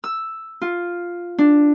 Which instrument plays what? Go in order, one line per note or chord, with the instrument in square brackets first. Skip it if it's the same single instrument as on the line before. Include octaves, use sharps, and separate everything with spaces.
[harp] E6
F4
D4